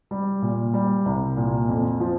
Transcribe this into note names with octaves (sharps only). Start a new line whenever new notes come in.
G3
A#2
G3
C2
A#2
F2
F3